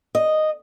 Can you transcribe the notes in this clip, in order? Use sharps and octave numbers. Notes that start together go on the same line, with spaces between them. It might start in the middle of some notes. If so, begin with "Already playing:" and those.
D#5